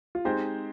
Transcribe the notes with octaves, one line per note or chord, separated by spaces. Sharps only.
F4
G#3 C4 D#4 G4 C5